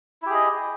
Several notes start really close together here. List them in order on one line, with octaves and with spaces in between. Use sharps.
E4 G4 G#4 D#5